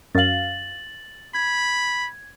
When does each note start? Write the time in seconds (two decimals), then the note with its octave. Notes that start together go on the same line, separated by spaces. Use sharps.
0.15 F#2 F5 A6 F#7
1.35 B5 G#6